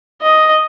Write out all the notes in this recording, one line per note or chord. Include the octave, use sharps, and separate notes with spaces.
D#5